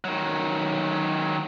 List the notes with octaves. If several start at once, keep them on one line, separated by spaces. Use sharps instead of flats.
D#3 F#3